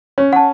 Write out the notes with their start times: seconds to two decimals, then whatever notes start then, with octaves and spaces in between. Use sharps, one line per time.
0.18 C#4 C#5
0.33 F#5 A5